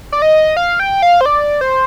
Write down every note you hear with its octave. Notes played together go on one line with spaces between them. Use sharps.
D5
D#5
F5
G5
F5
C5
D5
C5